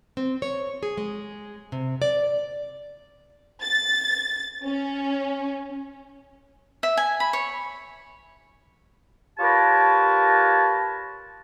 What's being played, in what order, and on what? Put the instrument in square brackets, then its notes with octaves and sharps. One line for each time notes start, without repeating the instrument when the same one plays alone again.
[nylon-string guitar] C4
C#5
G#4
G#3
C3
D5
[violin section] A6
C#4
[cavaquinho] E5
G#5
B5
C#5
[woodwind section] F4 G4 A#4 B4 C#5 A5